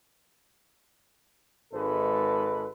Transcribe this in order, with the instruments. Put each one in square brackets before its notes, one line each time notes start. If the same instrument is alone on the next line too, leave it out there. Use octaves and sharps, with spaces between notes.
[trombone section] G#1 G#2 A4 B4